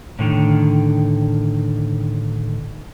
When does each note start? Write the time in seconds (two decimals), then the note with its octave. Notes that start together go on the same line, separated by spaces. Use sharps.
0.19 A2 D3 D#3